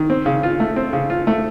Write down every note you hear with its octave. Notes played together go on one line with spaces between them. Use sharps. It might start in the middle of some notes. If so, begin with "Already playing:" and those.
Already playing: D#3
C4
C#3
F4
A3
C4
C#3
F4
A3